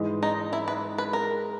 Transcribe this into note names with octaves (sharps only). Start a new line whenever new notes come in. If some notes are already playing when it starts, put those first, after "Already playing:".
Already playing: G#2 E3 G#3
D#4
E4
B4
B4
A#4